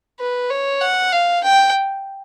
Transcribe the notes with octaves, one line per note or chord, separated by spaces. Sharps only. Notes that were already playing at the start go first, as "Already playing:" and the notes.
B4
C#5
F#5
F5
G5